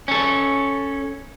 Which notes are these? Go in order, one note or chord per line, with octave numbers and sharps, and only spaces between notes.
C#4 A4